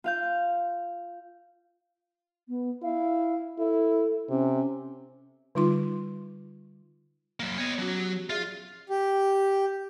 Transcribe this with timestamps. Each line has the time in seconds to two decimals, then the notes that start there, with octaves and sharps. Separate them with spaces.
0.04 F4 F5 G6
2.49 B3
2.83 E4 F5
3.59 E4 A4
4.30 C3 C#4
5.55 D3 G3 D#4 F4 C6
7.40 F#3 A#3
7.58 B3 C#5 D#5
7.79 F#3 C#4 F#4
7.98 G4
8.30 F4 G#4 D5 E5
8.89 G4